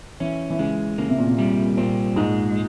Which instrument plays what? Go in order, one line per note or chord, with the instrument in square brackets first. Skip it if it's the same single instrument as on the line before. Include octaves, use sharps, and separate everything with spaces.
[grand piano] E3 [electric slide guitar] C#4
[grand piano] E3
[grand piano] C#3 [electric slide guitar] G#3
[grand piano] C#3 [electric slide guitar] A#3
[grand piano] C3
A#2
C3
[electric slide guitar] G3
[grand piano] A#2 [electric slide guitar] C4
[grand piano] G#2 [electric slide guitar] G#3